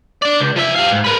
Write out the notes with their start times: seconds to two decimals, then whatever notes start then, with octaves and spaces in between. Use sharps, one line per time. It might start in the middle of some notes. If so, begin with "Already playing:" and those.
0.22 D4 D5
0.40 C#2
0.57 F3 E5
0.76 G3 F5
0.92 G#2
1.04 A#4 B4